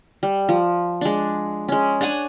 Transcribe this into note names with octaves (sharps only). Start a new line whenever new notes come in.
G3
F3
G#3 D4
G#3 C#4
D4 C#5 F#5 G#5